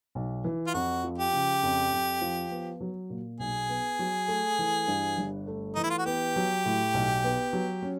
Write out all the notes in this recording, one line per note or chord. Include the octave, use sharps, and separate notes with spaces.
B1
E3
F4
F2 F#4
F3
G4
C#3
F2
F2
F3
B3
F#3
A#2
B1 G#4
B3
F#3
A3
E3
G2
G1
A3
E3 D#4
E4
F4
F#4
B3 G4
F#3
A2
B1
B3
F#3
C#4